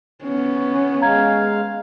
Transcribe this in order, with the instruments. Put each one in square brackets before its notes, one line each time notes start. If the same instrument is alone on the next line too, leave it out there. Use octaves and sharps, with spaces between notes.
[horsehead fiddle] B3 C#4
[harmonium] G#3 F5 [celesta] A#5 G#6